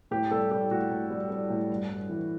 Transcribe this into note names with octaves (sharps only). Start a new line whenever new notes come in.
A2 G4
G3 A4
G3 G4
A2 F#4
A2
G3
G3
A2
G2
G2
E3